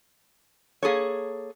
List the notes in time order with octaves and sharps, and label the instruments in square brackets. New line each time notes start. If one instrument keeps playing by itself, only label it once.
[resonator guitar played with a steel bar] A#3 G#4 A4 C#5